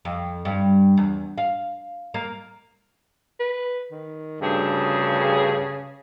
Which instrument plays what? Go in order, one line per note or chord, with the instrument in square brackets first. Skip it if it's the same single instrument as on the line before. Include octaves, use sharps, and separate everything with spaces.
[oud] F2
G2
E2
F5
A#3
[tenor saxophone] B4
D#3
[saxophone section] D2 G2 G#4 [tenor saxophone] C#3